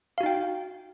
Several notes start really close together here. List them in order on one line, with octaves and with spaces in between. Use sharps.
F5 F#4 D#4 G5